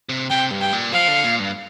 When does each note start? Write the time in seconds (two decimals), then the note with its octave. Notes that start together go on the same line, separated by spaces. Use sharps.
0.09 C3
0.30 C3 G5
0.51 G2
0.61 G5
0.73 A#2
0.93 F3 F5
1.08 D3
1.24 A#2
1.39 G2